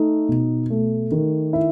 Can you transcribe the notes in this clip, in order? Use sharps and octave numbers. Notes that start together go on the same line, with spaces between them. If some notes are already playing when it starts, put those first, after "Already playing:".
Already playing: A3 D#4
B2
A3
D#3
E4